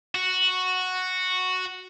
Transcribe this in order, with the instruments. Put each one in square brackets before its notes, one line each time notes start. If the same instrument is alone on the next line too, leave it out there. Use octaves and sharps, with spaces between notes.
[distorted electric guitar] F#4